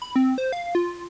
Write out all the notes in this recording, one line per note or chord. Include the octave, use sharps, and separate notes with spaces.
B5
C4
C5
F5
F4